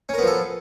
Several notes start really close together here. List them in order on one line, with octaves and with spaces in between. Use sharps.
C#4 A#4 B3 F3 A4